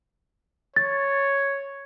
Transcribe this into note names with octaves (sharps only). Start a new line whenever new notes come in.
C#5 A6